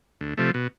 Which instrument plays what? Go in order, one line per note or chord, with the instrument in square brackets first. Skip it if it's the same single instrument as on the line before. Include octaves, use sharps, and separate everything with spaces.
[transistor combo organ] D2
C3 F3 A3
B2